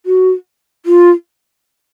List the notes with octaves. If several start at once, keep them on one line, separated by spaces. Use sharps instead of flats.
F#4
F4